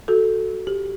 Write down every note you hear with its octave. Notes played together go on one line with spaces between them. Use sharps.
F#4 A4
G4